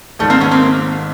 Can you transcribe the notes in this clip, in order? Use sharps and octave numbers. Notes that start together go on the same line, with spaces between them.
G#1 G#2 D#3 G3 A3
A#3 C4
B3 C#4
A#3 C4